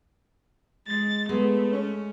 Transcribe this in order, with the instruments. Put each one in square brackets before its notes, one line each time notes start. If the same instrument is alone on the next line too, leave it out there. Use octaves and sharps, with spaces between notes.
[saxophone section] G#3 [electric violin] A6
[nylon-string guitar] G#3 [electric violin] A3 [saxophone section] B3
[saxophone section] C#4